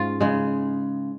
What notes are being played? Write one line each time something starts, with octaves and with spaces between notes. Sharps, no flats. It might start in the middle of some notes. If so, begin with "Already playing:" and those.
Already playing: G#2 C#4 F4
C#3 G#3